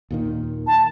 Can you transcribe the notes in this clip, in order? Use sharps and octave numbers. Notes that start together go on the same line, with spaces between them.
D#2 A#2 D#3
A5